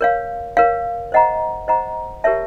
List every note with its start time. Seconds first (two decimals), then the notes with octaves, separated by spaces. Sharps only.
0.01 A#4 C#5 F5
0.57 A#4 C#5 F5
1.12 C5 D#5 F#5 A#5
1.68 C5 D#5 F#5 A#5
2.24 G4 A#4 C#5 E5 A5